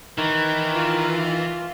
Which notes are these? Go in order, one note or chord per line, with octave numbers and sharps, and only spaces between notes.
D#3 E3
F4